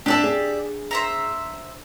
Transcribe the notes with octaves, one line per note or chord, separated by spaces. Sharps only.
D4 G4 D5 E5 A5
G#4
C5 E5 A#5